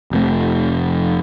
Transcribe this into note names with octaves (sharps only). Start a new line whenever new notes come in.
F1 F2 A3